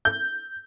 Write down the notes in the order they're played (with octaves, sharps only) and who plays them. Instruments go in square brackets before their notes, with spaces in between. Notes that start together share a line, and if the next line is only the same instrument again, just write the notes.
[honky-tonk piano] G6